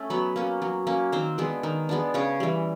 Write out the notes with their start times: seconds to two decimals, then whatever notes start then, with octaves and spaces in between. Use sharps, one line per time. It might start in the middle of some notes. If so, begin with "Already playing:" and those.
Already playing: A3 C#4
0.10 F#3 B3 B4
0.36 A#3 C#4
0.62 F#3
0.87 A#3 C#4
1.12 D#3 C4 C5
1.38 G#3 B3 D4
1.63 D#3
1.89 G#3 B3 D4
2.14 C#3 C#4 C#5
2.40 E3 G3